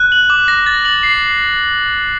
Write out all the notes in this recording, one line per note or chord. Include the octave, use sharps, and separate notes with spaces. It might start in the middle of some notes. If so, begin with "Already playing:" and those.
Already playing: F#6
F#7
D6
A#6
A6
F#7
C7